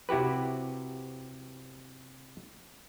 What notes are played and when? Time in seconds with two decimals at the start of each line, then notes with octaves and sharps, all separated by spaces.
0.09 C3 E4 F#4 G4 B4